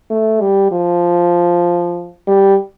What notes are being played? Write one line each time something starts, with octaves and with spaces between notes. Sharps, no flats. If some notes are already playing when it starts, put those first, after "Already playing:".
A3
G3
F3
G3